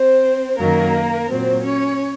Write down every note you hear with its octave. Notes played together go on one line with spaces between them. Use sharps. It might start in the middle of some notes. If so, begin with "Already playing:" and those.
Already playing: C4 C5
F#2 D#3 F#3 A#3 A#4
A#2 F#3 C4 C5
C#4 C#5